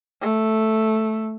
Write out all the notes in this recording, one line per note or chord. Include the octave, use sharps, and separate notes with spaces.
A3